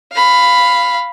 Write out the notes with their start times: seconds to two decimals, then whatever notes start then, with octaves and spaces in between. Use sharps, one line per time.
0.12 F5 B5